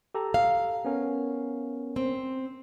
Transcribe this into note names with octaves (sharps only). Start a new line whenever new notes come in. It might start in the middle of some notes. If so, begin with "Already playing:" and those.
G4 A4 A#5
F5
B3 C#4 A#4
C4